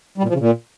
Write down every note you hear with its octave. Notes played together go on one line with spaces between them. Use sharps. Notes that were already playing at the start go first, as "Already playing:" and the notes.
G3
A#2
F3
C#3
A#2